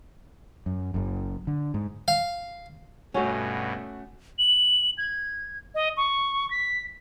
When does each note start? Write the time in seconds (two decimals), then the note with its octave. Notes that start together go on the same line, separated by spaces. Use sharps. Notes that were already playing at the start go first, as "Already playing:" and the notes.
0.66 F#2
0.94 F#1 F#2
1.47 D3
1.74 G#2
2.08 F5
3.14 G2 B2 A3 C#4 F#4 F#5
4.39 F#7
4.98 G#6
5.75 D#5
5.97 C#6
6.51 B6